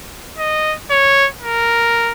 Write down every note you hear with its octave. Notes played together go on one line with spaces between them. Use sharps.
D#5
C#5
A#4